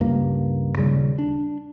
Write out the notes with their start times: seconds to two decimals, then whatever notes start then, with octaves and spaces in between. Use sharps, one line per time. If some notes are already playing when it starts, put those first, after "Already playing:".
0.01 C#2 G2 A#3
0.76 D#1 C#3 G3
1.19 D4